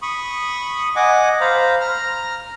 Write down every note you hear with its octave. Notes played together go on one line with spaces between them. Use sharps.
B5 C#6 D#6
D#5 F#5 G#5 D6
C5 F5 A#5 B5
A#5 F6